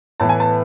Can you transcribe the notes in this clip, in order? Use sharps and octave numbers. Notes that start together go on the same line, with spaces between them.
A2 E3 B3 A5
G#5
A5